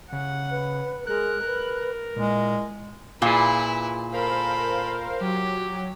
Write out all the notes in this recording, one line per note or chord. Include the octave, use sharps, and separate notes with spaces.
C#3 F#5
B4
G#3 A#4 F#6
A#4 B4
A#2 G#3 E4
A#2 E4 F4 G#4 B4
A4 A#4 C5 F5 B5
F#3 G4